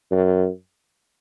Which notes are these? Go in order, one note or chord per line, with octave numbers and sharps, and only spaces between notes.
F#2